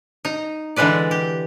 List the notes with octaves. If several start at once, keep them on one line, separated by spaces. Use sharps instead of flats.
D#4 A#5
D3 E3 G#3 B4 D5
G4